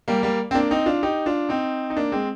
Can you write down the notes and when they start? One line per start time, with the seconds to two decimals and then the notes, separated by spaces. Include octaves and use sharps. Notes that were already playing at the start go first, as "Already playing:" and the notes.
0.08 G3 A#3
0.23 G3 A#3
0.51 C4
0.54 A#3 D4
0.71 C4 D#4
0.86 D4 F4
1.03 D#4 G4
1.26 D4 F4
1.49 C4 D#4
1.90 D#4
1.97 A#3 D4
2.12 G#3 C4